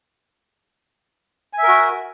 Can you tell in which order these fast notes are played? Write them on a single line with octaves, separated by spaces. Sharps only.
G#5 E5 A#4 F#4